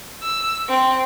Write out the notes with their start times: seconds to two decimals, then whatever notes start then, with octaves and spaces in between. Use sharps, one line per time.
0.22 E6
0.69 C4